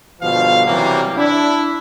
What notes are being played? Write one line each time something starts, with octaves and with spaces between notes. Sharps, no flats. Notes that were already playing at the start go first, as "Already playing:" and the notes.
G1 B2 F3 F5
C3 E3 F#3 G3 A#3
D4 E4